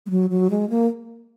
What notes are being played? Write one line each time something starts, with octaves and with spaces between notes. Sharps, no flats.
G#3
F#3
F#3
G#3
A#3